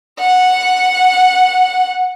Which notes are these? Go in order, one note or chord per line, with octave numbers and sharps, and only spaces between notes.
F#5